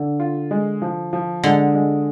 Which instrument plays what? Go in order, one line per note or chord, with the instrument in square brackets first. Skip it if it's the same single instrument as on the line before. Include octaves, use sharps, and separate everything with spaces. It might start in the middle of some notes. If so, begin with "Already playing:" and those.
Already playing: [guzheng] D3
[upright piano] F4
G#3
F3
F3
[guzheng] D3 [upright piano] G#3
[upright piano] G#3